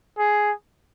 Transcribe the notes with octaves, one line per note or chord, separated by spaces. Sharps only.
G#4